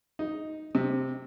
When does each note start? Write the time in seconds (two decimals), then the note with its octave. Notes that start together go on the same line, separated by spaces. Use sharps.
0.19 D#4
0.75 C3